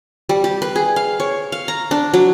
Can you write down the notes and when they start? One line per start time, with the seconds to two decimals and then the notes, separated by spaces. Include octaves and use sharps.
0.29 G3
0.44 G4
0.62 B4
0.76 G#4
0.96 F5
1.20 C#5
1.52 F5
1.68 A#5
1.91 D4
2.14 F#3